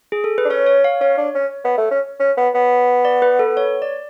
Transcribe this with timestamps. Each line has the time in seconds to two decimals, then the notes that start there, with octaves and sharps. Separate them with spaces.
0.12 G#4
0.24 A4
0.38 B4
0.45 D4
0.49 C#4 C#5
0.66 C#5
0.84 F5
1.01 C#4 C#5
1.17 D4
1.35 C#4
1.65 B3
1.78 A3
1.91 C#4
2.20 C#4
2.38 B3
2.55 B3
3.05 D5
3.22 B4
3.39 A4
3.57 C#5
3.82 D5